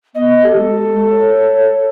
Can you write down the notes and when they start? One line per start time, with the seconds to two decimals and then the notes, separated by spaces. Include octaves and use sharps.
0.15 B3 D#5
0.43 G4 A4
0.57 G#3
1.10 C#5